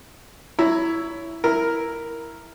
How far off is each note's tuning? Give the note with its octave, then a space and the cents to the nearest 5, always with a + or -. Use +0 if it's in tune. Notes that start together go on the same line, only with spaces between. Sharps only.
E4 +0 C#5 +15 A#5 +0
E4 +0 A#4 +0